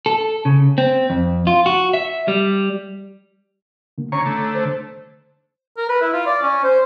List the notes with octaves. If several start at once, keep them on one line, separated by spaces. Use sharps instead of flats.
A4
C#3
C4
F2
F4
F#4
E5
G3
D3 A#3
D3 C#4 C#5 A#5 C#6
D3 A3
C5
A#4
B4
E4
F4
D5
C#4
C5